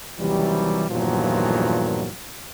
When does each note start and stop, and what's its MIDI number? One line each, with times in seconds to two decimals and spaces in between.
0.20 0.84 39
0.20 0.84 48
0.20 0.84 52
0.20 0.84 54
0.20 0.84 55
0.89 2.08 40
0.89 2.08 43
0.89 2.08 46
0.89 2.08 51
0.89 2.08 53
0.89 2.08 54